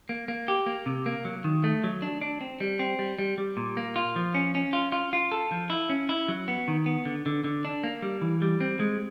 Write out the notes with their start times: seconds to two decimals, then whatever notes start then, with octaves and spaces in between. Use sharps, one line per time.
0.09 A#3
0.28 A#3
0.48 G4
0.66 A#3
0.86 C3
1.06 A#3
1.25 F#3
1.44 D#3
1.64 A3
1.84 F#3
2.02 D4
2.21 D4
2.41 C4
2.60 G3
2.79 C4
2.99 G3
3.19 G3
3.38 G3
3.57 A#2
3.77 A#3
3.96 F4
4.16 F3
4.34 C#4
4.55 C#4
4.73 F4
4.92 F4
5.13 F4
5.32 A4
5.52 F3
5.70 E4
5.89 C#4
6.09 E4
6.28 F#3
6.48 B3
6.68 D#3
6.86 B3
7.05 D3
7.26 D3
7.44 D3
7.65 D4
7.84 A#3
8.02 G3
8.21 E3
8.42 G3
8.61 C4
8.80 G#3